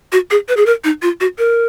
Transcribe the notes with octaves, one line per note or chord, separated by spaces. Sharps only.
F#4
G#4
B4
G#4
A#4
D#4
F4
F#4
A#4